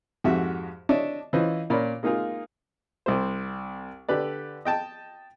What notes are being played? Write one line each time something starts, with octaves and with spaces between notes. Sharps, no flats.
F2 G#2 F#4 G4 E5
D4 C#5 D#5 E5
E3 C#4 F4 B4 C5 D#5
A#2 C#4 A#4 D5 B5
G#3 A#3 D#4 F4 G#4 A#4
C2 C3 C5
D3 G4 B4 D5
D#5 G5 A5